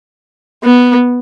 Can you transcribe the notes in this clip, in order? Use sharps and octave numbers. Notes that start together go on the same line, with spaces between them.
B3